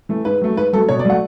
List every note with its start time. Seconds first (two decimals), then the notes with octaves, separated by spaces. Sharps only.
0.09 E3 A3
0.25 G#2 B4
0.41 F#3 A3
0.56 G#2 B4
0.73 F#3 A3 A4
0.89 B2 C#5
0.99 D5
1.05 F#3 A3 F#5